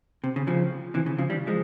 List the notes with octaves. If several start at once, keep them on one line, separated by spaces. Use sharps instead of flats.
C3
C#3
C#3 F3
C3 E3
C#3
C#3 F3
E3 G3
F3 G#3